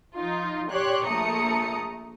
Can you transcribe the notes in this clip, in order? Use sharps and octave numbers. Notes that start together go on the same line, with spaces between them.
F3 D#4 F4
G4 C#5 D5 C6 F#6
A#1 A3 A#5 D#6 C#7